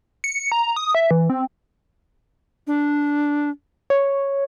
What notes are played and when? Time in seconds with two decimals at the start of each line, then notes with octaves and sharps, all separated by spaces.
0.24 C#7
0.52 A#5
0.76 D#6
0.95 E5
1.11 E3
1.30 C4
2.67 D4
3.90 C#5